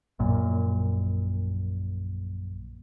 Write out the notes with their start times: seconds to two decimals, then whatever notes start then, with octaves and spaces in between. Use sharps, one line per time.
0.19 A#1 F#2 A#2